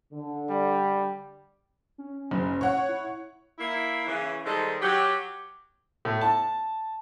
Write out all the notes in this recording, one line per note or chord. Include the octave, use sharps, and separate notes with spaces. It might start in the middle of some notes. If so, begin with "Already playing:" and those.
D3
G3
C#4
F#1
C#5 F#5
E4
A#3 E4
C#3 E3
D#3 G3 G#3 A4 C5
F#3 G4
A2
A5